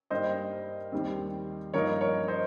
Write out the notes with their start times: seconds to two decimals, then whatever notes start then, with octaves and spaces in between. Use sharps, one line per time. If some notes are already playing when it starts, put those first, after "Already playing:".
0.10 G2 G3 A#3 D#4 C5 D#5
0.92 D#2 D#3 G3 C4
1.74 G2 F3 A#3 D#4 A#4 C#5
2.01 A#4 C#5
2.28 C5 D#5